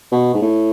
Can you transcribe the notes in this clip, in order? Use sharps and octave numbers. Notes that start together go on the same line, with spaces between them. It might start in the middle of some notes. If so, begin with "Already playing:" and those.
B2
G#2
A2